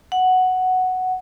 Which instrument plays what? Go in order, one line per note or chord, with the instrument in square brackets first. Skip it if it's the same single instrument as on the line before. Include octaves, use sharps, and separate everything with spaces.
[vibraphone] F#5